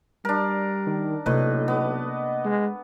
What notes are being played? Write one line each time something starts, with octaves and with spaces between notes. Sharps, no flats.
G3 D4 A#4
D#3
B1 A2 C3 A#3 B4 D#5
B3
G#3